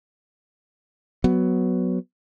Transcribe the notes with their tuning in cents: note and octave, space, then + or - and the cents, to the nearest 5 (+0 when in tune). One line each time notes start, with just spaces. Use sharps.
F#3 +0 B3 +5